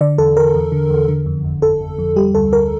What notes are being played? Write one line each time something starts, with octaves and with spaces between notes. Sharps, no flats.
D3 D5
E2 A4
E2 A#4
E2
D3
E2
D3
F2
G1
G1 A4
G1
F2
G3 G4
D2 A4
D2 A#4